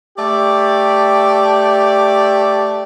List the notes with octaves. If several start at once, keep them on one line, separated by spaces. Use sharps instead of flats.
A3 G4 D5